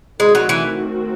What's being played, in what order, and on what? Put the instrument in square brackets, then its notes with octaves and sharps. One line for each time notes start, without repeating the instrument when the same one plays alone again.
[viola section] D#3 A3 C4 F#4 [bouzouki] G#3
[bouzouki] F#3
E3